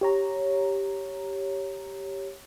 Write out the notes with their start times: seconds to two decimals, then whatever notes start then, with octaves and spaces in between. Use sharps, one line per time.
0.01 G4 C#5 A#5